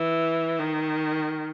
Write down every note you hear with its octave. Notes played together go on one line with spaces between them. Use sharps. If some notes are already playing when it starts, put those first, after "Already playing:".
Already playing: E3
D#3